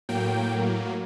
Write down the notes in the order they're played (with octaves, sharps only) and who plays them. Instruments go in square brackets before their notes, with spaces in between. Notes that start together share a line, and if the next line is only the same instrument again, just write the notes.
[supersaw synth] A2 F#3 A#3 G5